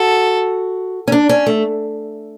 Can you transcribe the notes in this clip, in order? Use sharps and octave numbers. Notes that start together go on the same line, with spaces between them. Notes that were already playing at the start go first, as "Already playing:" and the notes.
Already playing: F#4 A4
C#4
D4
C#4
A3